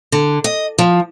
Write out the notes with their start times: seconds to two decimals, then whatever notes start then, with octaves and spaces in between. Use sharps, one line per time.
0.12 D3
0.44 D#5
0.78 F3